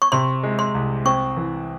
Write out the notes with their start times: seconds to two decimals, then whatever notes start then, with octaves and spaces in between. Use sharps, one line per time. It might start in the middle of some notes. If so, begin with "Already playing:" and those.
0.02 C#6
0.12 C3 C6
0.43 G#3
0.59 C6
0.75 C2
1.05 C4 C#6
1.37 E3